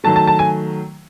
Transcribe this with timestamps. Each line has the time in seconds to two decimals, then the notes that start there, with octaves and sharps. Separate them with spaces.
0.04 D#3 F#3 A3 A5
0.16 A5
0.27 A5
0.39 G#5